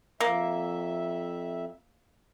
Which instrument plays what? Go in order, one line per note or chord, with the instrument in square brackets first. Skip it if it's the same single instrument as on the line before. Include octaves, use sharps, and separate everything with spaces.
[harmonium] F2 E5 [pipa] A#3